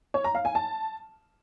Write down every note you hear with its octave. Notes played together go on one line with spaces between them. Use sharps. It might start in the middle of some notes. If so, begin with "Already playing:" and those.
C#5
A#5
F5
G#5
A5